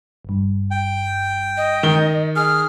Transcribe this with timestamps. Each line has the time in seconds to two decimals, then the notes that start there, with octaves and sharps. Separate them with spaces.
0.25 G1 G2
0.71 G5
1.57 D#5
1.83 D#3 G7
2.36 G#4 F6